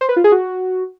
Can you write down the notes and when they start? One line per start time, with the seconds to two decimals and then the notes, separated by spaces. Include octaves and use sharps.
0.01 C5
0.09 B4
0.16 F4
0.24 G#4
0.32 F#4